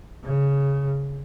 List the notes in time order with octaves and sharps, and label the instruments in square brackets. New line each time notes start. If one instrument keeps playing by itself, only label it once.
[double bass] C#3